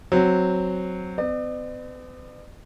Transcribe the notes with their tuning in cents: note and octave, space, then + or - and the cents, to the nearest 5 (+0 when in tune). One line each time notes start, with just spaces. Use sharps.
F#3 +0 C4 +0
B3 +45 D5 +40